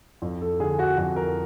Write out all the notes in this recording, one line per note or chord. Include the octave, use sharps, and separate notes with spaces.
F2
A4
D3 G#4
F#4
F2 F#4
A#4